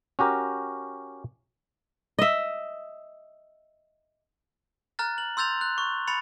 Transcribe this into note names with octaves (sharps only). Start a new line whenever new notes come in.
C#4 F#4 G4 A#4
D#5 E5
A#5 F6 F#6 A6
F#7
C6 E6 G6 A6 F7
F#6
C#6
B5 A6 C#7 F7